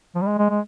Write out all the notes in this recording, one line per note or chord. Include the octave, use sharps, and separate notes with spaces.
F3
G3
G#3
G#3
G#3